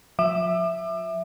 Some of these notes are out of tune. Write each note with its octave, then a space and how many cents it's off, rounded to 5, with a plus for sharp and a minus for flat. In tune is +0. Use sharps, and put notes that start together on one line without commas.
F3 +45 E5 +0 D6 +35